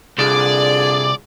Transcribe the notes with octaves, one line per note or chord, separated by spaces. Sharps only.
C2 D3 F4 G#4 D5